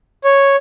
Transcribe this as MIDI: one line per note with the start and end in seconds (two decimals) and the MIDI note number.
0.24 0.56 73